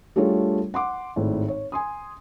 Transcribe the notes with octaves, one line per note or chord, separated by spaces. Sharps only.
G3 A3 D4 F4 G#4 C#5
F#5 C6 D6
G#1 A2
C#5
G#5 C6 D#6